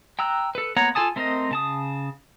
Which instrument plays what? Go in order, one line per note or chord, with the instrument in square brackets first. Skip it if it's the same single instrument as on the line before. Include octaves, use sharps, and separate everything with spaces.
[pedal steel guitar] G5 A#5 E6 F#6
A4 B4
A#3 B3 C#5 F#5 A#5
F4 A4 G#5 A5 D#6
A3 C4 A#4 C5 D#5
C#3 A5 D#6